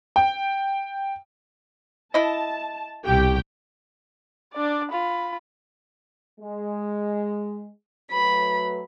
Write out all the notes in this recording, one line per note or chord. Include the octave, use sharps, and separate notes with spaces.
G5
E4 D#5 A5
C2 B2 G4 G5
D4 D5
F4 B5
G#3
F#3 A3 B4 B5